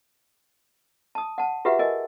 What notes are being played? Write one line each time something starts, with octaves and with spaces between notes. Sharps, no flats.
A5 D#6
F#5 A5
F4 G4 G#4 B4 E5 F#5
A#4 D#5 G#5